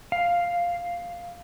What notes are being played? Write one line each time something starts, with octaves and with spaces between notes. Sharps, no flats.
F5